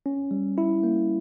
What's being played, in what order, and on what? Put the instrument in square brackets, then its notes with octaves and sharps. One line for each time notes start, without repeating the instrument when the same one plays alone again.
[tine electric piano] C#4
G3
E4
A#3